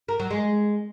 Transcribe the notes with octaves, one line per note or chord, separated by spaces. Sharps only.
A#4
F#3
G#3